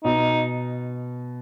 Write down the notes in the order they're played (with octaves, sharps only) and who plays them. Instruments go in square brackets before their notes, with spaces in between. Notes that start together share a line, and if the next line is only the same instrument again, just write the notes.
[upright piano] B2 [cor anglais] D#4